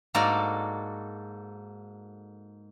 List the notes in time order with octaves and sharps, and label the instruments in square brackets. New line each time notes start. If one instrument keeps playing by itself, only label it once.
[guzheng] G#2 A#3 F#4 A4 D5 A#5